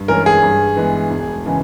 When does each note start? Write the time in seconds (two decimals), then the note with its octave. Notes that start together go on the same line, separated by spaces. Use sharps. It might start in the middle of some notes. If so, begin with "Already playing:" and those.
Already playing: G2
0.08 E3 G#3 C#4 A#4
0.26 G#4
0.43 G2
0.76 E3 G#3 B3
1.11 E1
1.46 C#3 E3 G#3